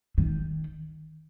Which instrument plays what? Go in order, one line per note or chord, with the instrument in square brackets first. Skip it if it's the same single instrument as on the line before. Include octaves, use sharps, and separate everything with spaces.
[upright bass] D#3